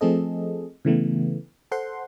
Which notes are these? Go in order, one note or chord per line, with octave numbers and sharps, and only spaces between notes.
F3 A3 C4 G#4 A4 D#5
C#3 E3 A3 B3
A4 C5 F#5 C6